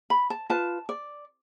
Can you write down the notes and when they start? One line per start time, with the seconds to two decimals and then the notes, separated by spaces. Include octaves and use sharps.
0.10 B5
0.30 A5
0.50 F4 B4 A5
0.89 D5